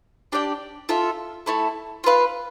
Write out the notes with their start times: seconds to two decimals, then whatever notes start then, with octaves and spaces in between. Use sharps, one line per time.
0.32 D4 G4 D5 G5
0.89 F4 A4 E5
1.46 A3 E4 A4
2.04 F4 B4 F5